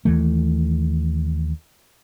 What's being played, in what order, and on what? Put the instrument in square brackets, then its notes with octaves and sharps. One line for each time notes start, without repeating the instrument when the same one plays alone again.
[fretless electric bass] D#2 E3 A3